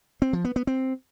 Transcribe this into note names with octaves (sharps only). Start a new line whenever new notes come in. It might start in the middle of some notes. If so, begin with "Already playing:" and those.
C4
F3
B3
B3
C4